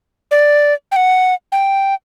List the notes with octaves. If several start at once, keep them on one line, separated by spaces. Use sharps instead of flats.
D5
G5
F#5
G5